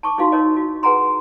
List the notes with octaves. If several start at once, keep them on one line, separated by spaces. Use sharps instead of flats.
A5 C#6 D6
D#4 E4 F#4 F5 C6
D#4 A#4 C#5 D#5
F#4
G#4 B4 F#5 G#5 A#5 C6